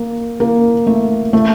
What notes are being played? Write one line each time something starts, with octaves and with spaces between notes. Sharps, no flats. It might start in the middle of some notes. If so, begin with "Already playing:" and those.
Already playing: A#3
A#3
A3
A3